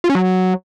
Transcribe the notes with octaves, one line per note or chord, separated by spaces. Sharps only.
F4
C#4
F#3